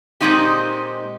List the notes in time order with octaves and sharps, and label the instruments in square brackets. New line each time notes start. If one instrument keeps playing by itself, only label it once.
[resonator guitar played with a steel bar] A#2 C#3 G#3 C4 D#4 G4